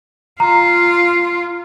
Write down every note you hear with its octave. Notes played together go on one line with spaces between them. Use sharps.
F4 A#5